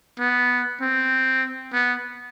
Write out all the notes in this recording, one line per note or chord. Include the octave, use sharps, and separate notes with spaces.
B3
C4
B3